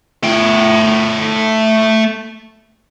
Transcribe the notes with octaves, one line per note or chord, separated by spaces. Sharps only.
A3 G5